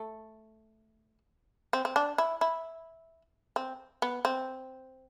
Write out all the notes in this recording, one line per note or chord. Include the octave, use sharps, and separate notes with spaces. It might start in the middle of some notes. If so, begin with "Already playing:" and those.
Already playing: A3
C4
C4
D4
E4
E4
C4
B3
C4